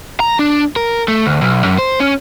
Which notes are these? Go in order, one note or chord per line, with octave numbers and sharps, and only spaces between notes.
A#5
D4
A#4
A3
D2
B1
F#2
C5
C#4